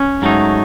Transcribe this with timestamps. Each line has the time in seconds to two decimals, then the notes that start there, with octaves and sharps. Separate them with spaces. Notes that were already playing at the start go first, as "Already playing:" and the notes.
Already playing: C#4
0.22 G#2 F#3 A3 D#4